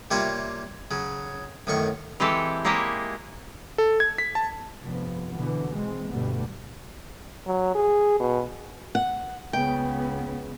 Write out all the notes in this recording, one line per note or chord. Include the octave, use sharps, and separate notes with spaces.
C3 G3 A#3 F4 C#5 E5
C#3 F#3
F#2 A2 D#3 C#6
E3 G#3 C4 G4 A4
G#3 A#3 E4 G4 G#4 C#5
A4
G#6
B6
A5
F1 G2 F3 B3
B2 D3 E3 B3
E3 G#3 C4
D2 G2 B2 G3 A3 B3
F#3
G#4
B2
F#5
C#2 C#3 B3 G5